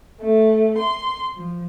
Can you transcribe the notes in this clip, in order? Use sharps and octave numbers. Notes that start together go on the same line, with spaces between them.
A3
C6
F3